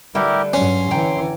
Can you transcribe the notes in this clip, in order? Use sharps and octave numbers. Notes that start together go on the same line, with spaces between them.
D3 G3 A3 E4 G4 A#4 B4
G2 F#3 C#4 C6
D3 E3 C#5 G5 A#5